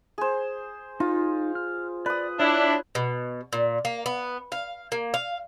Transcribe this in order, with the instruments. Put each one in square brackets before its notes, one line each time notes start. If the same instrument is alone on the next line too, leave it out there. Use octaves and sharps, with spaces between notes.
[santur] G#4 C5
[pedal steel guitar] D#4 [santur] F4
[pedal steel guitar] F6
[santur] B4 D#6 [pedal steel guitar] D5
[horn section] D4 E4 [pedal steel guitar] C#5
[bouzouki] B2
A#2
A#3
B3
F5
A#3
F5